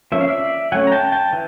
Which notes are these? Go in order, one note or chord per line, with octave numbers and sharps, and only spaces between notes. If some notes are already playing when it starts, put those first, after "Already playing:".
F3 A#3 C#4 E5
F5
D5 E5
F#3 A3 C#4 F#5 G#5
A#5
G5 A5
G5 A5
E3